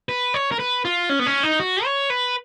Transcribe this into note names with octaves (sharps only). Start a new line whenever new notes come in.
B4
C#5
A#4
B4
F4
C#4
B3
C#4
D#4
F#4
C#5
B4